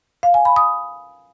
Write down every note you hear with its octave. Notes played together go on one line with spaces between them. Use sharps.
F5
G#5
B5
D#6